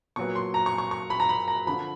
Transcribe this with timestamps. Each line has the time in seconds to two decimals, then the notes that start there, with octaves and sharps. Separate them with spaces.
0.16 A#2 F#3 B3 C#6
0.35 C6
0.54 A#5
0.66 C#6
0.78 C#6
0.91 C#6
1.10 B5
1.20 A#5
1.29 B5
1.48 A#5
1.66 D3 F3 B5